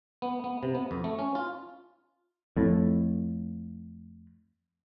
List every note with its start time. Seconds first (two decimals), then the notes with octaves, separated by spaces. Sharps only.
0.22 B3
0.44 B3
0.63 C3
0.75 B3
0.91 F2
1.04 A3
1.19 C#4
1.35 F4
2.57 F2 A2